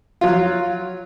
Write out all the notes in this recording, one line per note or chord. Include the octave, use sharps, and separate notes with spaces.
F#3 F4